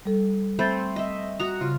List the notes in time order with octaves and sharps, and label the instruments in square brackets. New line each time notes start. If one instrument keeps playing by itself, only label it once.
[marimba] G3 A4
[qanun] A3 C4 C5 [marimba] B5 G6 A6
[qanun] D#5 E5
[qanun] F#4 A#5 [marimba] D#6
[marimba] C#3 [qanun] F4